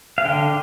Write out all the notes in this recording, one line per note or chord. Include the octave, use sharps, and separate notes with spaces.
F5
D3 G5